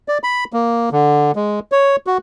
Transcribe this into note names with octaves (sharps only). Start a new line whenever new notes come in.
D5
B5
A#3
D3
G#3
C#5
F#4